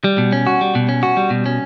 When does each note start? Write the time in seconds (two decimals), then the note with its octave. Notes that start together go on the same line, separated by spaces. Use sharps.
0.04 G3
0.18 B2
0.32 C#4
0.47 F#4
0.61 G3
0.75 B2
0.89 C#4
1.03 F#4
1.17 G3
1.30 B2
1.46 C#4